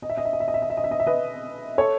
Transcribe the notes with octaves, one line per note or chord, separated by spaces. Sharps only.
D#5
E5
D#5
E5
D#5
E5
D#5
E5
D#5
E5
D#5
E5
D#5
E5
B4 D#5
A4 C#5